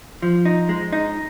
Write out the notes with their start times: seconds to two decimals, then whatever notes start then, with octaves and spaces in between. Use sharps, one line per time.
0.22 F3
0.45 D#4
0.69 G#3
0.93 D#4